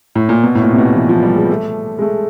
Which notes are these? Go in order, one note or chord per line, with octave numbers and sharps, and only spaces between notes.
A2
A#2
B2
A2
A#2
C3
B2
E3
F3
G3
G#3
A3
G#3
A3